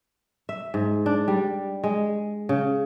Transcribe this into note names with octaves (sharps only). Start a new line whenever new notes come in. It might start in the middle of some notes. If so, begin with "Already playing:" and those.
E5
G#2
D4
G3
G#3
C#3